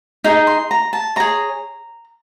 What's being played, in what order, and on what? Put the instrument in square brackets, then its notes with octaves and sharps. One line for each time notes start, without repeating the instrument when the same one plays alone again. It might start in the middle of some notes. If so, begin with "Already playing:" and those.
[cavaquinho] D#4 G#4
C6
A#5
A5
G#4 C#5 A#5